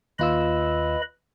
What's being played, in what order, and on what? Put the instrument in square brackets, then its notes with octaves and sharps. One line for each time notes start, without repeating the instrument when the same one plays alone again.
[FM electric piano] D#2 F4 E6 [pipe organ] B4 D#5 B5